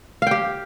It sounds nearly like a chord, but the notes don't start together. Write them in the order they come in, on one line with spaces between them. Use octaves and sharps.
F5 G5 G4